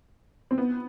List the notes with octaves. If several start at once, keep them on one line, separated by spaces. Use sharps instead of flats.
C4
B3